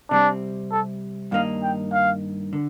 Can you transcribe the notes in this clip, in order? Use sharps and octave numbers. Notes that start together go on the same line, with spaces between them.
C3 G3 C4 D4
A4
G2 D#3 A#3 D#4 F5
G5
F5
D3